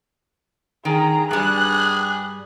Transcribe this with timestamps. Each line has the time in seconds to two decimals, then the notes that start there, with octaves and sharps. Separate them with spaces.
0.85 D#3 G#4 A#5
1.31 G2 G3 G#4 F#6